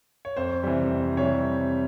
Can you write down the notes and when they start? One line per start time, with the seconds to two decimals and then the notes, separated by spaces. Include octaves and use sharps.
0.25 C#5
0.37 F2 C5
0.63 C3 E3 G3
0.91 F2
1.17 C3 E3 G3 C#5